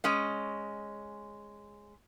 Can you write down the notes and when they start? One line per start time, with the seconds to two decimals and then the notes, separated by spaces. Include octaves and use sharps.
0.04 G#3 C#4 D#5